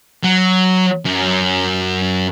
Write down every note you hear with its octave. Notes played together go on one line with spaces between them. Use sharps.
F#3
F#2